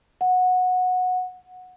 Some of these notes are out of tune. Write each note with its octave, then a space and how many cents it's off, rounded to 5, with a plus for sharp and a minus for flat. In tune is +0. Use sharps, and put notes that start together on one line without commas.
F#5 -15